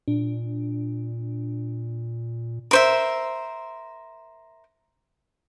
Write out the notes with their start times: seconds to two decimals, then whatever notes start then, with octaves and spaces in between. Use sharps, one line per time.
0.08 A#2 D4
2.71 A#4 C5 E5